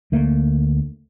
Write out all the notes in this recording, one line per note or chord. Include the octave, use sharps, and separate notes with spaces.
D2 A3 A#3